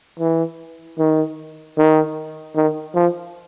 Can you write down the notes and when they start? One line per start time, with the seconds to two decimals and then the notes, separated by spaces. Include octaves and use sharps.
0.19 E3
0.99 D#3
1.77 D#3
2.56 D#3
2.95 F3